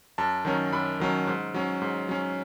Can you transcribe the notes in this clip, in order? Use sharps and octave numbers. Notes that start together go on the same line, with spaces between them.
F#2 A5
D#3 F#3 C#4
F#2 B5
D#3 F#3 C#4
G#2
F#3 C#4
G#2
F#3 C#4